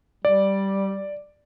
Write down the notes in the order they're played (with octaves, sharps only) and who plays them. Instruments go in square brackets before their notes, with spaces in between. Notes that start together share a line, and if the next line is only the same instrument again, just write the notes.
[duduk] G3 [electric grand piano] D5